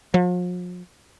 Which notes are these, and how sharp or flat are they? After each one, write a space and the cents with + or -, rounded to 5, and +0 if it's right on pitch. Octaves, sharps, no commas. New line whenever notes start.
F3 +40